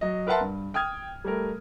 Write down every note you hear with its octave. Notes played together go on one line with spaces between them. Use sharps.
F#3 D#5
A#4 B4 E5 F#5 A5 C6
G2
G5 D#6 F6 G#6
G3 A3 A#4